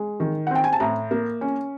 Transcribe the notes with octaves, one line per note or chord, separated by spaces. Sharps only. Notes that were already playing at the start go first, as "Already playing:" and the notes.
Already playing: G#3
D#3
F#5
C4 G5
G#5
A5
A2 A#5
A#3
C#4